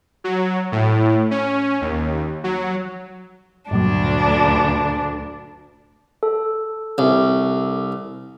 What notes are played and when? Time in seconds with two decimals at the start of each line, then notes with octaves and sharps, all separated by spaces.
0.24 F#3
0.72 A2
1.31 C#4
1.81 D#2
2.44 F#3
3.71 D2 G2 A#2 F#3 D4
6.23 A4
6.98 C2